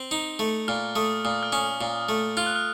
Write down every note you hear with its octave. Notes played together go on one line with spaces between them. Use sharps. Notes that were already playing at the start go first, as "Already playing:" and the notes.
Already playing: C4
D#4
A3
A#2 F6
A3 D#6
A#2 D#6
F6
C#4 D#6
A#2
A3
F4 F6
F#6
F6